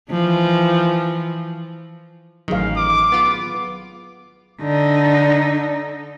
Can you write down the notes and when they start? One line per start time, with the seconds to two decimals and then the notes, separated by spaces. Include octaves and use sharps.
0.11 E3 F3
2.48 A1 D#3 F#3 G#4 F5
2.77 D6
3.12 B3 F4
4.62 D3 D#4